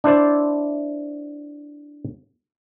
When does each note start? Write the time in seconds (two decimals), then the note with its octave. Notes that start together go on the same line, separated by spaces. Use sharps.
0.04 D4 E4 C5 D5